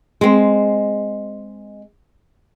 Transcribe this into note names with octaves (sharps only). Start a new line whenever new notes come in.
G#3 C4